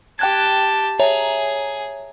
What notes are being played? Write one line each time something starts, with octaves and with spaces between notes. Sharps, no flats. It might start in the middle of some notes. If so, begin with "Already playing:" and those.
G4 G5 A5 F#6 G#6
G#4 C#5 E5 A#5